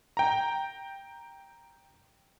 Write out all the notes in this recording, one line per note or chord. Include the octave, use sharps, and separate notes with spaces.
G5 A#5